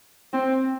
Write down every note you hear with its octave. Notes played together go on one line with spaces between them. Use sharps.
C4